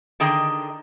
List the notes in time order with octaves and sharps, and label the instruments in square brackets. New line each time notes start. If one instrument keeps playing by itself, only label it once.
[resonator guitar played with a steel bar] D3 D#3 G#4 D#5 G5 A#5